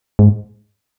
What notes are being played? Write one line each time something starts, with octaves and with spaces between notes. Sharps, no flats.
G#2